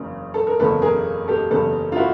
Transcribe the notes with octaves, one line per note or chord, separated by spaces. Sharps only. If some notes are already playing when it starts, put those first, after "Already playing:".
Already playing: F#1 E2 C#3
A4
A#4
F#1 E2 C#3 A4 B4
G#4 A#4
G4 A4
F#1 E2 C#3 A4 B4
F4
E4 F#4